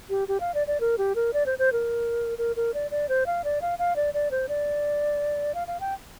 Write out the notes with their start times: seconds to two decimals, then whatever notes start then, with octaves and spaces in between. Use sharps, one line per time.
0.10 G4
0.28 G4
0.40 F5
0.54 D5
0.67 D5
0.80 A#4
0.98 G4
1.15 A#4
1.33 D5
1.46 C5
1.59 C5
1.73 A#4
2.38 A#4
2.56 A#4
2.74 D5
2.91 D5
3.09 C5
3.26 F5
3.44 D5
3.62 F5
3.79 F5
3.96 D5
4.14 D5
4.31 C5
4.49 D5
5.55 F5
5.68 F5
5.80 G5